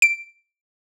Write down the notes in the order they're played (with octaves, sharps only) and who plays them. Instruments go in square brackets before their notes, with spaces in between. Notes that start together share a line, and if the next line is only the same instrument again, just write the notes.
[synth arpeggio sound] D7